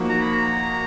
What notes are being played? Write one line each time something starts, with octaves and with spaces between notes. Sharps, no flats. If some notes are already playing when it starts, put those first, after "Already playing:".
Already playing: F3 A#3 D#4 F#4
A#5
B5
A#5